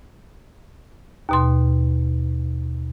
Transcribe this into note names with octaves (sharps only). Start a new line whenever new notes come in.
D#2 B2 C6